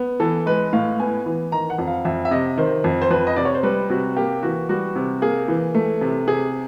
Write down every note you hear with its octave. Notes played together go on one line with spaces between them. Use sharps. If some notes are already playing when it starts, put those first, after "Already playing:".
Already playing: B3
E3 A4
G#3 B4
A2 F5
B3 G#5
E3
D#3 A#5
F#5
F2
F5
F2 E5
E5
C3 D#5
D#3 C5
F2
C5
F2 B4
D#5
C3 D5
C#5
C5
G3 B4
C3 F#4
A#3 G4
E3 F#4
G3 F#4
C3
A#3 G#4
E3
A3
C3
C3 G#4